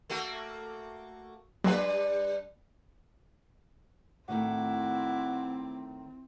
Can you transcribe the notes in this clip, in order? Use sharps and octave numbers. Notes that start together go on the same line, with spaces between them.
A3 A#3 F#4
F#3 G3 A#3 D4 F#4 B4
A2 D#3 A3 C4 E4 F#4 D6